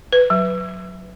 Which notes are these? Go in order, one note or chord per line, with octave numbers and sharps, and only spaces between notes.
B4
F#3